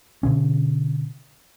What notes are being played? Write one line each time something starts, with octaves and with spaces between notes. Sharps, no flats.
B2 D3 C#4